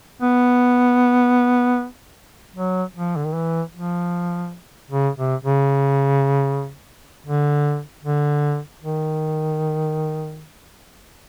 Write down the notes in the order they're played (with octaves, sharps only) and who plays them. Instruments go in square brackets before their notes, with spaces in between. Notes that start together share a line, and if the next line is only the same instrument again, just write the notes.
[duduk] B3
F#3
F3
D3
D#3
E3
F3
C#3
C3
C#3
D3
D3
D#3